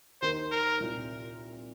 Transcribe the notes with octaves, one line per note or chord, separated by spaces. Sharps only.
D#2 D#3 A#3 D#4 C5
A#4
C2 A#2 A#3